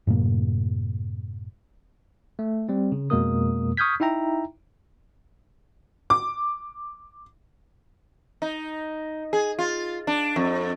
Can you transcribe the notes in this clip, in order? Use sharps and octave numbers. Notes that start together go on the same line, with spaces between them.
F#2 A2 C3 A#3
A3
G3 C4
C#3
F2 B2 G#3 A#3 A#4 D#6
C#6 D#6 F6 G6 G#6 B6
D#4 E4 E5 G5 A#5
D6
D#4
G#4
F4
D4
F2